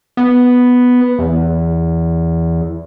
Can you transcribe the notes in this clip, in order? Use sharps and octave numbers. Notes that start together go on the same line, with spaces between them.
B3
E2